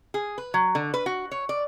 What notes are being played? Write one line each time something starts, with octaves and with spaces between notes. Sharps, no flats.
G#4
B4
F#3
D3
B4
F#4
C#5
D5